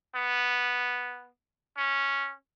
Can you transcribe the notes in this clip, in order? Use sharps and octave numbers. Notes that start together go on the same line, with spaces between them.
B3
C#4